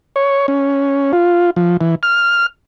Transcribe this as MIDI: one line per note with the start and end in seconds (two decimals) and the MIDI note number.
0.16 0.46 73
0.48 1.12 61
1.13 1.50 65
1.56 1.77 53
1.81 1.95 52
2.03 2.46 89